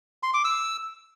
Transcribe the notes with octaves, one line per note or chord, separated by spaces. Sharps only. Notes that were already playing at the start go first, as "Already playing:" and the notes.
C6
D6
E6